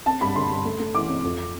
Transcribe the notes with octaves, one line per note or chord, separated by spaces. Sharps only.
C4 A5
G2 B5
D3 C6
G2
A3
A3
E3 D6
C4
F2